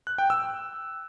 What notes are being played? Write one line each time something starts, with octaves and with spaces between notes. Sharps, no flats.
F#6
G5
E6